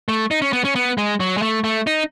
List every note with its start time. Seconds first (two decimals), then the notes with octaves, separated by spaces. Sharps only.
0.09 A3
0.31 D#4
0.42 C#4
0.53 B3
0.65 C#4
0.75 B3
0.98 G#3
1.20 F#3
1.37 G#3
1.42 A3
1.64 A3
1.87 D#4